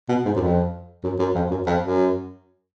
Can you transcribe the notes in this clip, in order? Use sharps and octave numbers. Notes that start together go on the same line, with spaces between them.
B2
G#2
F#2
F2
F#2
F#2
F2
F#2
F2
F#2